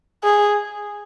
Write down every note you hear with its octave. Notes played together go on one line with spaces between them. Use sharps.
G#4